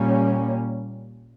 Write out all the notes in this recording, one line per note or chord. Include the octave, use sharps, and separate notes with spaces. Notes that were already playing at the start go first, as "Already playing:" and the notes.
Already playing: A#2 G3 A#3 C#4